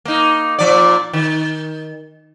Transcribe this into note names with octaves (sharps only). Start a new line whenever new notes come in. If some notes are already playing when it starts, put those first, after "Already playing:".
A#3 D#4
A#2 F3 D5
D#3